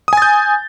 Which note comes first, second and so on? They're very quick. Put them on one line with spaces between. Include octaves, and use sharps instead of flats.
D#6 G#5 A6 G6